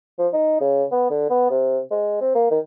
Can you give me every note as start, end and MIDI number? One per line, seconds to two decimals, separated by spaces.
0.19 0.28 53
0.33 0.56 63
0.61 0.84 49
0.92 1.06 59
1.10 1.27 50
1.30 1.50 59
1.50 1.79 48
1.91 2.16 56
2.21 2.33 60
2.35 2.48 58
2.51 2.59 51